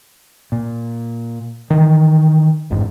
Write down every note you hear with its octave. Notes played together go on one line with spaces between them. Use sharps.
A#2
D#3 E3
A1 F2 G#2